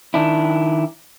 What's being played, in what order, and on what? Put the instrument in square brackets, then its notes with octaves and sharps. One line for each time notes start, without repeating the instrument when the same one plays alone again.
[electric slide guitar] D#3 D4 E4